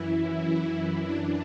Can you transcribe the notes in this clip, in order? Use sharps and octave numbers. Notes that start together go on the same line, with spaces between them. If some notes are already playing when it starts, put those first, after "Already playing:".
Already playing: F#2 E3 E4
F#2 E3 D4